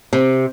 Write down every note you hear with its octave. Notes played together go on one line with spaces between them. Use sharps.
C3